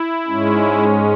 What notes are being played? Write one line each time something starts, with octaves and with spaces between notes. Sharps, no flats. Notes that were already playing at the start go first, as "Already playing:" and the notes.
Already playing: E4
G#2 G#3 C#4